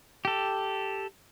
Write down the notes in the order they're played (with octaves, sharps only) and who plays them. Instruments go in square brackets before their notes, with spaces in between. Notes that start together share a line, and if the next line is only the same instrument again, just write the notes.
[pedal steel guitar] G4 A4